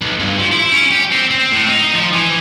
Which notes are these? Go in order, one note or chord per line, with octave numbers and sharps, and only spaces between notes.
B1
G2
F3
E4
C#4
G4
C4
C4
A2
D#4
F3
E3